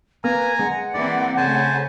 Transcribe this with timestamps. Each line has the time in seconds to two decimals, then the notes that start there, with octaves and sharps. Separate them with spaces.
0.24 A#3 B4 G#5 A#5
0.59 G#3 F#5
0.94 E3 A#3 C4 D5
1.37 C#3 A3 C5 G#5 A5